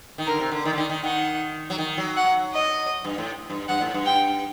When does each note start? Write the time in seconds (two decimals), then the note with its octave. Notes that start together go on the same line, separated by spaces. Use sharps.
0.18 D#3
0.27 D3 A#4
0.40 C3
0.52 D3
0.65 D#3 D5
0.73 D3
0.78 D#3
0.89 D#3
1.03 D#3 F#5
1.70 F#3
1.78 D#3
1.98 F#3
2.17 F#5
2.54 D#5
3.05 G2
3.18 A2
3.50 G2
3.68 G2 F#5
3.81 A2
3.94 G2
4.06 G5